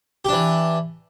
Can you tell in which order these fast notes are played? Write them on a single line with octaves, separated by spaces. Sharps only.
G4 D4 E3